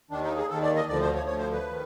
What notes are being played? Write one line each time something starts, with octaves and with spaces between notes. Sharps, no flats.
D#2 D#3 D4
D#4
G#4
D#2 D#3 A4
D5
D#5
D2 D3 F3 D5
C5
C#5
D2 D3 F3 C#5
C5
B4
D#3